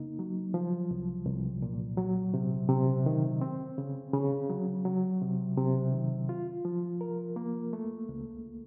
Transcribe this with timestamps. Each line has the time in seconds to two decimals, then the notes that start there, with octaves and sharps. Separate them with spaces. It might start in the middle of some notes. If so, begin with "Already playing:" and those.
Already playing: C#3 A#3 D#4
0.19 F#3
0.54 F3
0.91 C2
1.26 C2
1.62 A#2
1.98 F#3
2.34 C3
2.69 C3
3.06 D#3
3.41 C4
3.78 C#3
4.13 C#3
4.50 F#3
4.85 F#3
5.22 C3
5.57 C3
5.92 D#3
6.29 F4
6.65 F3
7.01 A#4
7.36 A#3
7.73 A3
8.09 C#2